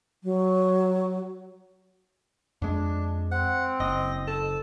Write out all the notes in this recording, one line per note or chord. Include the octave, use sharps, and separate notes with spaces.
F#3
F2 G#3 D4
C4 F#5
F#1 D#5
A4